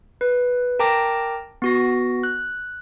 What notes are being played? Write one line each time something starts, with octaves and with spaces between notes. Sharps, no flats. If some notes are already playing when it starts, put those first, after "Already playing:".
B4
A#4 G5 A5 A#5 D6 A#6
B3 F#4 A#6
F#6